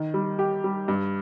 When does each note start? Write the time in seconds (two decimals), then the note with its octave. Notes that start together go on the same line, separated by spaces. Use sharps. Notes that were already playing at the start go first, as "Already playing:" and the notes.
Already playing: D#3
0.14 G3
0.39 G4
0.64 G3
0.88 G2